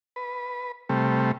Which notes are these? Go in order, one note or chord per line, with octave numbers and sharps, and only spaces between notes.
B4
C3 G3 A3